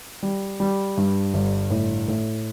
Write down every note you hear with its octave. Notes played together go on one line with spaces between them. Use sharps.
G3
G3
G2
G1
A2
A2